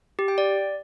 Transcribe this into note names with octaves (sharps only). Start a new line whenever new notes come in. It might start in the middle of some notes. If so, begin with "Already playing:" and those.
G4
G5
D5